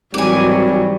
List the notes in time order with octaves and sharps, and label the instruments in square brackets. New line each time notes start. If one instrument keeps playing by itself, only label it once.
[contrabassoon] G#1 [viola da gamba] G#2 E3 F#3 [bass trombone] G3 [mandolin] G#5 D6